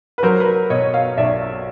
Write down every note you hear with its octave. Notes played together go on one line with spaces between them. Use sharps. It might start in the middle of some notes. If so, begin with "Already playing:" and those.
B4
F#3 A#4 C5
B4
A#4
B2 C#5 D#5
D#5 F5
B1 D5 E5